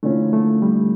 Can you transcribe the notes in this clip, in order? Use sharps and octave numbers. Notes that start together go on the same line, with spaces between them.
D3 F3 A3 A#3 C#4 E4
A3
G3